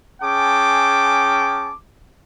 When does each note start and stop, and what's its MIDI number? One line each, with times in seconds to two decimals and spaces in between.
0.23 1.71 61
0.23 1.71 68
0.23 1.71 79
0.23 1.71 81
0.23 1.71 86